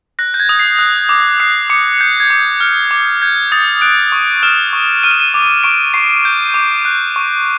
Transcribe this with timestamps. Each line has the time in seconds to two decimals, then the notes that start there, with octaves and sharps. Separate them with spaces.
0.19 F#6 A#6
0.34 G6
0.40 G#6
0.49 D#6
0.59 C7
0.79 F#6
1.09 D6
1.40 F#6 C7
1.70 D6 C#7
2.01 G6
2.20 G#6
2.30 D6
2.60 F6
2.91 D6
3.22 G6 G#6
3.52 D#6 A6
3.82 F#6 D7
4.12 C#6
4.43 F6 E7
4.73 C#6
5.03 F6 D#7
5.11 E7
5.20 D#7
5.34 D6
5.63 C#6 D7
5.94 C#6 C7
6.25 G6
6.54 D6
6.85 F#6
7.16 C#6